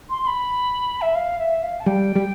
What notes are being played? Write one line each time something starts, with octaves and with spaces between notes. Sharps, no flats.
C6
C6
B5
E5
F5
E5
F5
A5
G3 G5
G3